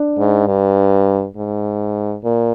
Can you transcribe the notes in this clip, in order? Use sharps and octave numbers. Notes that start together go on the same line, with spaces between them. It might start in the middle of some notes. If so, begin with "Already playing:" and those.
Already playing: D4
G#2
G2
G#2
A#2